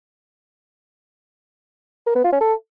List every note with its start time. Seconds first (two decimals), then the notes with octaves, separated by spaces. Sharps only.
2.07 A#4
2.15 B3
2.24 F4
2.32 C#4
2.41 A4